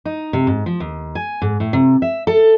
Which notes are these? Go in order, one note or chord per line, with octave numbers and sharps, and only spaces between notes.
D#4
C3
G#2
F3
D#2
G#5
G#2
A2
C3
E5
A4